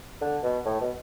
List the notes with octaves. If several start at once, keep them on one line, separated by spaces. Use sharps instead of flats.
D3
B2
A2
B2